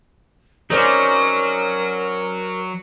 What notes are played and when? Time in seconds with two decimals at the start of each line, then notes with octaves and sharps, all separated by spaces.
0.70 F#3 C#4 D#4 G#4 A#4 C5 D5